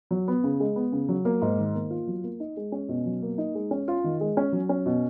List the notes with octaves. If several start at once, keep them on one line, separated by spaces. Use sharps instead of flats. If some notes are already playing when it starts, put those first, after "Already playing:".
F#3
B3
C#3
G#3
B3
C#3
F#3
A#3
G#2
D#3
A#3
F4
F#3
A#3
D#4
G#3
C#4
B2
F#3
A#3
D#4
G#3
C#4
F4
D#3
G#3
C#4
F#3
C#4
B2